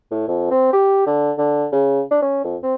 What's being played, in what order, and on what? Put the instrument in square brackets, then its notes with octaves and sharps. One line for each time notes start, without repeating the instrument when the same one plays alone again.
[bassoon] A2
F2
C4
G4
D3
D3
C#3
D4
C#4
F2
C4